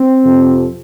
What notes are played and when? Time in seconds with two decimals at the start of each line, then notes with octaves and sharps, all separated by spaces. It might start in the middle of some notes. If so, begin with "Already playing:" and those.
Already playing: C4
0.25 F2 C3 F3